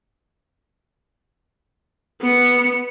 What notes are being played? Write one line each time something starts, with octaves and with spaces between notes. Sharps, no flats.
B3 C#7